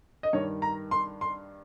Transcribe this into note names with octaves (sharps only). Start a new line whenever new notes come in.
D#5
G2 D#3 C#5
A#5
C6
C6